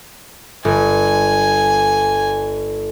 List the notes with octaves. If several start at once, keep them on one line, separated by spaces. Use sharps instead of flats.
G1 G#5